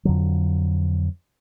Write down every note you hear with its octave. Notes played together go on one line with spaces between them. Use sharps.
F2 D3 F#3